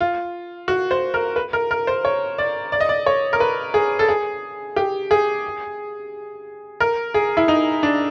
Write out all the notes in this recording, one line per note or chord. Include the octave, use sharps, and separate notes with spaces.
F4
F#4
C5
A#4
B4
A#4
A#4
C5
C#5
D5
D5
D#5
D5
C#5
A#4
B4
G#4
A4
G#4
G4
G#4
A#4
G#4
E4
D#4
D4